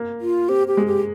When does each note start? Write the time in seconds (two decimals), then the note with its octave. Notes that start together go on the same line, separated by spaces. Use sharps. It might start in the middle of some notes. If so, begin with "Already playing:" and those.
Already playing: A#3
0.21 F4
0.49 C4 G4
0.68 G4
0.77 G#3
0.86 G4